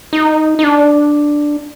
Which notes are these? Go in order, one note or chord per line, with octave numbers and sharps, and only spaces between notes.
D#4
D#4
D4